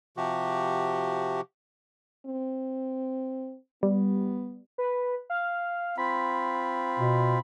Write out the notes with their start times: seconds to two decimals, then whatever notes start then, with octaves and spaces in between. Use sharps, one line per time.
0.17 C3 F3 F#4 G4
2.26 C4
3.83 G3 B3
4.78 B4
5.30 F5
5.98 C4 F4 B5
6.99 B2